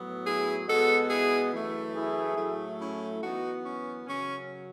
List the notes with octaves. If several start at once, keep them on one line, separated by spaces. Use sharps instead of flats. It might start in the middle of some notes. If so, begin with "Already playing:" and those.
Already playing: A2 F#3 B3
E4 G#4
B2 G#3 B3 F#4 A4
E4 G#4
F#2 E3 A3
E4 G#4
A2 F#3 A3
C#4 E4
F#2 E3 B3 D#4 F#4
C#4
F#2 C#3 F#3 C#4